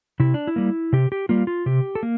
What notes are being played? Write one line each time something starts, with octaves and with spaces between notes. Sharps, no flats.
C3 E4
D4
E4
G3 A#3
C3 G4
G4
G3 A#3 F4
F4
C3 G4
A4
A#3